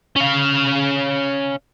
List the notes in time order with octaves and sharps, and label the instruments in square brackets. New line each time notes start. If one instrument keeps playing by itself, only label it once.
[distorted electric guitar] C#4 F5